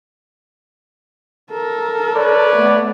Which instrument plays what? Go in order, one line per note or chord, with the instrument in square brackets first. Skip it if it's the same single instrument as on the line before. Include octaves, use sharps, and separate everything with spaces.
[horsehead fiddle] A4 A#4
[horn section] B4 C#5 D5
[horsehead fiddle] A3 B3